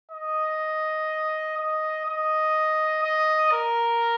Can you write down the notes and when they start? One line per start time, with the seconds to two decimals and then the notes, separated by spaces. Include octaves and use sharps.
0.11 D#5
1.57 D#5
2.06 D#5
3.03 D#5
3.51 A#4